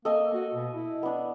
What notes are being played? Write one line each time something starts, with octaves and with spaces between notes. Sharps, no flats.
A#3 A4 D#5 G#5
F#4
B2
E4
B3 D4